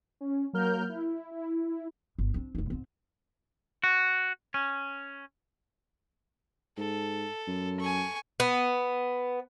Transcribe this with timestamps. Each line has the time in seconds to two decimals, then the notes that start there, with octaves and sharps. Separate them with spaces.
0.21 C#4
0.53 F#3 A#3 A#4 F6 G6
0.89 E4
1.31 E4
2.19 G1
2.34 C4 D4
2.55 F1 D#4
2.70 G#2 C4
3.84 F#4
4.54 C#4
6.78 G#2 A4
7.47 F#2
7.80 G#5 C#6
8.40 B3